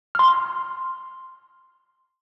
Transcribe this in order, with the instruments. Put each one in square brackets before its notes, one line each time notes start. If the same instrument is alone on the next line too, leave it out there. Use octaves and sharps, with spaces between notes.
[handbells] C6 F6